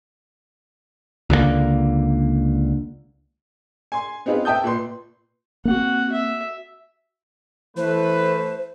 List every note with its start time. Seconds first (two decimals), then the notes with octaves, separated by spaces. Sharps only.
1.30 C#2 D3 D#3 A#3
3.92 G#5 C6
4.26 B3 C4 D#4 F4 G#4 B4
4.45 E5 G5 A5 D#6 G6
4.64 A#2 B4 C6
5.65 A#3 C4 F#4 F#5
6.12 E5
7.77 E3 A3 B4 C5